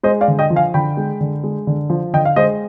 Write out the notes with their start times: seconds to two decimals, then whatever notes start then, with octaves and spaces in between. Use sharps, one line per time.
0.03 G#3 C5 D#5
0.21 D5 F5
0.28 D3
0.39 D#5 G5
0.50 F3
0.56 F5 G#5
0.74 D3 G5 B5
0.97 G#3
1.21 D3
1.44 G#3
1.67 D3
1.90 F3
2.13 D3 D#5 G5
2.25 F5
2.36 G#3 C5 D#5